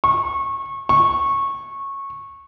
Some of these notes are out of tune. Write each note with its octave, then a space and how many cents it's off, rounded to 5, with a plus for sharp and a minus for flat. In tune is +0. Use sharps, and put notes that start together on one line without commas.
C#6 -25
C#6 -15